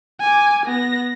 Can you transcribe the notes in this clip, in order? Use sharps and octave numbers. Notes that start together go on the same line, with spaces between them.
G#5 D6
B3 A#6